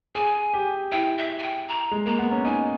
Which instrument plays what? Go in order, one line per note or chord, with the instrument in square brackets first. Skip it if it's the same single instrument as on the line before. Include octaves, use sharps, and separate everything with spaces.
[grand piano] G#4 [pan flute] G#5
[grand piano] G4
[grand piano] E4 [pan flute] G5
[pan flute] E5
G#5
G5
A#5
[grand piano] G#3
[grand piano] A#3 [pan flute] A#5
[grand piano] B3
C#4
[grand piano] D#4 [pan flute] G#5